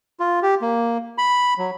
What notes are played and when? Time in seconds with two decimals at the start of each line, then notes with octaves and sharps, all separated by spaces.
0.20 F4
0.43 G4
0.62 A#3
1.18 B5
1.58 F#3